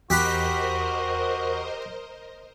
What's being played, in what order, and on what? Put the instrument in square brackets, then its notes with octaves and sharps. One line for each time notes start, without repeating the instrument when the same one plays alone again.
[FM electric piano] E2 [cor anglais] F#4 [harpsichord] G4 F#5 B5 [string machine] A#4 C5 D#5